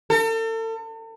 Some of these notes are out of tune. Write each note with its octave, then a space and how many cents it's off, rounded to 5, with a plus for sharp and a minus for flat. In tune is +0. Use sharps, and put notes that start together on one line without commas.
A4 +40